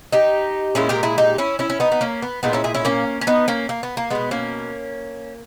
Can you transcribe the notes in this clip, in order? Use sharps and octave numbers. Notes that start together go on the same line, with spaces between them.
D#4 G4
A#2 G#3 C#4 E4
G4 A#4
E4 G#4
D#4 G4
C#4 E4
C#4 E4
C#4
B3 D#4
B3
A#3 C#4
B3
A#2 G#3 B3 D#4
C#4 E4
E4 G#4
C#4 E4
A#3 C#4
C#4
B3 D#4
A#3 C#4
A#3
B3
A#3
B2 G#3 B3
A#3 C#4